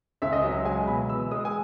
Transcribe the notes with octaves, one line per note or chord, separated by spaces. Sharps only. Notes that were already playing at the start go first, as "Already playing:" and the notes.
C#2 E5
D#5
F#3 E5
G#3 G#5
B2 B5
E3 E6
G#3 D#6
G#5